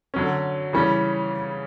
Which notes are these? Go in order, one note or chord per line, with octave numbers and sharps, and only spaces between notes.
D3 F#3 C#4
C#3 E3 G3 C#4